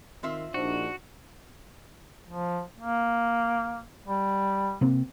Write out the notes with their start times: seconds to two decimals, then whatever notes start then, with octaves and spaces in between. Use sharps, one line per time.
0.23 D#3 C4 F4 E5
0.54 A#1 D4 D#4 F#4 C5
2.28 F3
2.78 A#3
4.07 G3
4.81 C3 A#3 C4